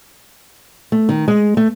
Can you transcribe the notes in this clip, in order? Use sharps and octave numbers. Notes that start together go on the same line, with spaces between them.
A3
D#3
G#3
A3